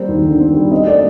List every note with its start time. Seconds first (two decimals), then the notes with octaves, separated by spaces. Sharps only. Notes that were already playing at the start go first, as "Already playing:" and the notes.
Already playing: G3 A#3 C4 C5
0.09 D#2
0.24 D3
0.39 C4
0.56 G3
0.71 C4 D#5
0.87 A3 D5